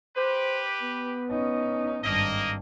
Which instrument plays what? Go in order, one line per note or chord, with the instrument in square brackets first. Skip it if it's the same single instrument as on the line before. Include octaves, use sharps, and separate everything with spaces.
[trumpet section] G4 B4 [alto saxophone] C5
[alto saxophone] B3
[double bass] C#4 D#4
[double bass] G#1 G2 [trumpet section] A#3 D#5